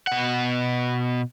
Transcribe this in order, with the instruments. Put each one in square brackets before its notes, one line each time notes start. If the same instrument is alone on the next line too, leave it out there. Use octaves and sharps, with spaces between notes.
[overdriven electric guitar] B2 F#5